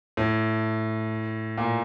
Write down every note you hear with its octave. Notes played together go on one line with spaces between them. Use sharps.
A2
A#2